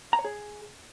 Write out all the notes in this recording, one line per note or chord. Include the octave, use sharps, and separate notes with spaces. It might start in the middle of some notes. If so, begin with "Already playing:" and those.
A#5
C#5
G#4